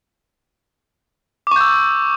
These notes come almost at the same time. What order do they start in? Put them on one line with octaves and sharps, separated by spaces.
D6 C#6 G6 E6